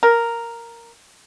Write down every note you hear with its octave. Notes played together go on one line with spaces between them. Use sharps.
A#4